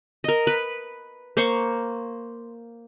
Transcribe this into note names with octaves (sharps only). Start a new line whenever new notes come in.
A#4 D#5
B4
A#3 C5 C6 C#6